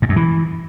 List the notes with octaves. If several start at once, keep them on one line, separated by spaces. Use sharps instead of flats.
G#2
F#2
E3